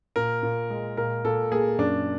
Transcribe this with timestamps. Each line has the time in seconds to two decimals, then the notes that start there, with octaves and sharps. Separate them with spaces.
0.16 A#2 A#4
0.43 A#2
0.70 G#3
0.97 A#2 A#4
1.24 A#2 A4
1.52 A#3 G#4
1.78 F#2 D4